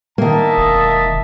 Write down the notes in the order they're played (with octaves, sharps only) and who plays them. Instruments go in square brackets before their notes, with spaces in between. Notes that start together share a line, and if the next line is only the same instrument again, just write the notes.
[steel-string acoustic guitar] D#3 A#3 [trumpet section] D#5 E5 A5
[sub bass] E1